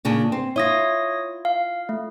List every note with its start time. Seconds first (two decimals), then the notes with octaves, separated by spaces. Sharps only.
0.05 A#2 C#3 D4
0.32 C4
0.56 E4 F4 C#5 D#6 A#6
1.45 F5
1.89 A3